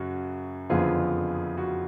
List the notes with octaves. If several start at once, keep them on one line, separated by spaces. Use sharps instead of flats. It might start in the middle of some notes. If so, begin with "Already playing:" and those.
Already playing: F#2 C#3 F#4
F#1 F2 D3 F3 B3 F4 G#4
F#4